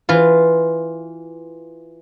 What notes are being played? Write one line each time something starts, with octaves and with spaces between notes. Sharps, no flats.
E3 F4